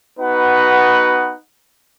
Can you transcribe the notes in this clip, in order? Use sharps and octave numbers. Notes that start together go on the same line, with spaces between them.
B3 D#4 F#4 B4 F#5